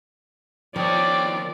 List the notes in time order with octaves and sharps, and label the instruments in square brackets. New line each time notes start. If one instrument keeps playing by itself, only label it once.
[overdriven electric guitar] D#3 C#5 [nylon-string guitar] F3 [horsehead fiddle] D5 [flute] G5